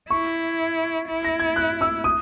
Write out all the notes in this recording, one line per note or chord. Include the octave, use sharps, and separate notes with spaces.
E4 C#6
E4
A#6
G#6
F#6
E6
D#6